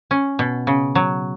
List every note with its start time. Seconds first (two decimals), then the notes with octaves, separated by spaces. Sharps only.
0.11 C#4
0.39 B2
0.67 C#3
0.95 F#3